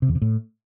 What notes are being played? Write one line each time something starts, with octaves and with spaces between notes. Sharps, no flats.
C3
E2
C3
A2